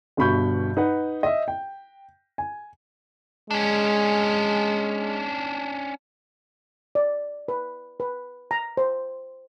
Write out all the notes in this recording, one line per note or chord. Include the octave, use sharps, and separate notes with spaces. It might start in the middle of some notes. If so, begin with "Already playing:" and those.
G1 G2 B2 B5 C#6 G6
D#4 B4 F#5
D#5 E5
G5
G#5
G#3 C#4 D4
D5
B4
B4
A#5
C5